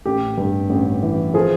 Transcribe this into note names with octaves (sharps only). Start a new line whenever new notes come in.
A1 G4
G2
A1
E3
F3 G#4